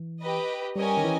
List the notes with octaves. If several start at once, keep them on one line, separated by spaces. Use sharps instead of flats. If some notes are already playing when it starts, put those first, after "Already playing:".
Already playing: E3
G4 B4 D#5
G3 C#4 G4 A#4 D#5 G#5
D#3
E3